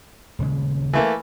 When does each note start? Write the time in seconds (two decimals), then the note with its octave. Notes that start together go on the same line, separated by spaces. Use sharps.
0.39 D#1 C#3 G#3
0.93 E3 A3 A#3